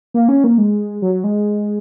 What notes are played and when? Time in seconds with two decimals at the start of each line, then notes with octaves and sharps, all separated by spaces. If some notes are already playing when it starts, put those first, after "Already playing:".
0.14 A#3
0.29 C#4
0.44 A#3
0.58 G#3
1.02 F#3
1.24 G#3